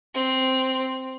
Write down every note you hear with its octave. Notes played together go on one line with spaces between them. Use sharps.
C4